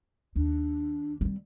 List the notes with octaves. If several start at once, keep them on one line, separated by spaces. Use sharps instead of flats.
D#2 D4
G3 C4